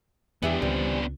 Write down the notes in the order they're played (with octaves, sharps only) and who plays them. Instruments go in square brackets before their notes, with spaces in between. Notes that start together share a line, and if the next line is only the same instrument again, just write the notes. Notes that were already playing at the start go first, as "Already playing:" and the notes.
[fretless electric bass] E2 [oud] E3 E4 G4 [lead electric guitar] B3 D4
[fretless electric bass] C#2 [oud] E3 G3 C4